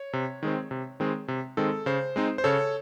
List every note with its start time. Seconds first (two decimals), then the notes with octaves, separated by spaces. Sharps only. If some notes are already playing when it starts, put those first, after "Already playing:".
Already playing: C#5
0.13 C3
0.43 D#3 G#3 C4
0.71 C3
1.00 D#3 G#3 C4
1.28 C3
1.57 D#3 G#3 C4 A4
1.86 C#3 C5
2.16 G#3 C4 D#4
2.38 C5
2.44 C#3 A4 C#5